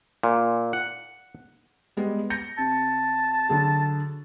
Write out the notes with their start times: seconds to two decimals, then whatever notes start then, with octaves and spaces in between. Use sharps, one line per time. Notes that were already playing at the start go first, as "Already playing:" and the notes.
0.23 A#2
0.73 F#5
1.97 G3 G#3 B3
2.30 G6 A#6 C#7
2.58 C3 A5
3.49 D3 F#3 G#4